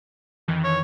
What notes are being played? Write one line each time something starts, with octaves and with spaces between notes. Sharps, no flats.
F2 D#3 E3
C#5